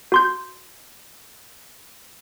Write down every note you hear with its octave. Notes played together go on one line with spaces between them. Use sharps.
F#4 C6 G6